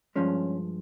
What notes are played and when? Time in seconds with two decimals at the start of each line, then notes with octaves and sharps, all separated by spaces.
0.15 G2 F3 G#3 C#4